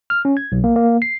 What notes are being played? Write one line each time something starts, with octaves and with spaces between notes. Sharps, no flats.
F6
C#4
G#6
B1
A#3
A#3
C7